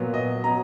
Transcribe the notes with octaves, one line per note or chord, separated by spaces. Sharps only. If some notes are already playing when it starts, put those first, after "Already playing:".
Already playing: A#2 F#3 B3
D#5
F#3 B3 A#5